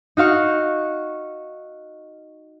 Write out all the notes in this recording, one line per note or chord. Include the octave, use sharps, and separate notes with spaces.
D#4 F#4 F5 C#6